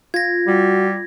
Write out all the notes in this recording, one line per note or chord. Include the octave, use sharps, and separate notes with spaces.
F4 G#6 A#6
G3 F#4